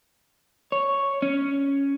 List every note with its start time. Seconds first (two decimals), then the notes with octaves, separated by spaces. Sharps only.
0.72 C#5
1.22 C#4